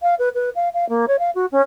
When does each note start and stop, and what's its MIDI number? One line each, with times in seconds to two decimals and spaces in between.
0.02 0.15 77
0.19 0.29 71
0.35 0.50 71
0.55 0.69 77
0.74 0.88 77
0.89 1.06 58
1.08 1.16 73
1.19 1.31 77
1.35 1.46 66
1.52 1.61 61